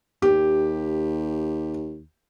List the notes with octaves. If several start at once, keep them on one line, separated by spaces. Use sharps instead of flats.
D#2 G4